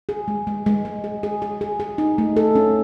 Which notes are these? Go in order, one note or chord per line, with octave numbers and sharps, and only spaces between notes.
G#4
G#3
G#3
G#3
G#3
G#4
G#4
G#4
G#4
G#4
D#4
A3
A4
C#4